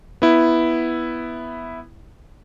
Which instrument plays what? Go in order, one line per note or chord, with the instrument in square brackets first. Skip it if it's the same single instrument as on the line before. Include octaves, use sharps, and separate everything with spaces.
[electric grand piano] B3 E4